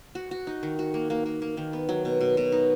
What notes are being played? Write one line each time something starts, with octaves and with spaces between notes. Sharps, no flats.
F#4
F#4
D#4
D#3
F#4
A#3
A#3
A#3
A#3
D#3
B3
F#3
B2
B2
B2
D#4